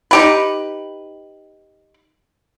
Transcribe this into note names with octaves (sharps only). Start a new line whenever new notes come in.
D#4 G4 B4